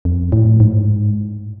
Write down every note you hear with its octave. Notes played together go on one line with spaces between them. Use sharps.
F2
A2
G#2